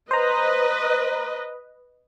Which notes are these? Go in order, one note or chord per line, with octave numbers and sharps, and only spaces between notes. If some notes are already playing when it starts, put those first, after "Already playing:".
B4 C5 D#5 A#5